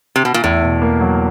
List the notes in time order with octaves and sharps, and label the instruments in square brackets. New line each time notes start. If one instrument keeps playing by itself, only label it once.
[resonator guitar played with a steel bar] C3
B2
A#2
[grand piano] E2 [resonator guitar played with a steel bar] A2
[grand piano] B2
A#3
F#3